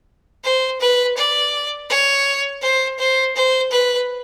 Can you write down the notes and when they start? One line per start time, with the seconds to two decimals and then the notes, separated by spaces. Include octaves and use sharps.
0.44 C5
0.80 B4
1.17 D5
1.89 C#5
2.62 C5
2.98 C5
3.35 C5
3.71 B4